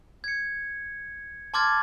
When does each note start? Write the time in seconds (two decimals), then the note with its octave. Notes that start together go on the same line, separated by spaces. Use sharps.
0.24 G#6 C#7
1.54 A5 C6 D6 F6 G#6 A6